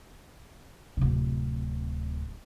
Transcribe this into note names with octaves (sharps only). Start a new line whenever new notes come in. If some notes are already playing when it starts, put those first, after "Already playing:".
D1 C3